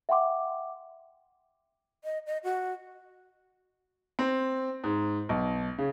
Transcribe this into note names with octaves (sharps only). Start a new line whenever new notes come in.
E5 F#5 G5 C6 D6
D#5
D#5
F#4
C4
G#2
B1
C#3